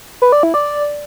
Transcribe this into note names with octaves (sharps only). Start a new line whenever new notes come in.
B4
D5
E4
D5